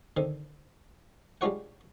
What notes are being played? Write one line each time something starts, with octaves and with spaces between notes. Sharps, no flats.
D3 D#3 C4
G3 G#3 D4 F4 C#5 F#5